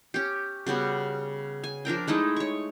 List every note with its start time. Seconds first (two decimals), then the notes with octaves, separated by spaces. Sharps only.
0.14 C#4 G4
0.67 C#3 G3 B3 F#4
1.64 G#5
1.85 F3 D4 A#4 G5
2.08 G#3 A3 D#4 E4
2.36 C#5 C#6